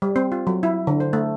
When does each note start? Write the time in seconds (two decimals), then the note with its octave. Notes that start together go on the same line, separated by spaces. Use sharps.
0.02 G3
0.16 C4
0.32 F4
0.47 F#3
0.63 E4
0.87 D3
1.00 C5
1.13 A3